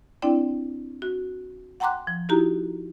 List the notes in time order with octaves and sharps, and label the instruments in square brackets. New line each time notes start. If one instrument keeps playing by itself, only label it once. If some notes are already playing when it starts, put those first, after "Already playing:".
[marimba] C4 D4 E4 D5 G5
F#4
F#5 G5 A#5 C6 D6 F#6
F3
D#4 E4 F#4 G4 A#5